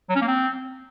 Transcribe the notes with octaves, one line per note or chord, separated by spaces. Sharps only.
F#3
C#4
A#3
C4